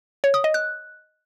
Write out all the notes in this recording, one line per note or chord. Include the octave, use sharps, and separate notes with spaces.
C#5
D#6
D#5
F#6